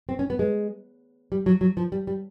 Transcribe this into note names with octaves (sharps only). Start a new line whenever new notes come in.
C4
C#4
B3
G#3
G3
F#3
F#3
F3
G3
G3